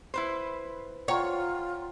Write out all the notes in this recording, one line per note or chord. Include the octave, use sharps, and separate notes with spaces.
E4 B4 C5
F4 C#5 F#5 G5 A#5